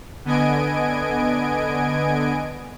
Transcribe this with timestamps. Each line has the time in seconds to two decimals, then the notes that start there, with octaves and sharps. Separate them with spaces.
0.25 D3 B3 D#5 G#5 G#6 D7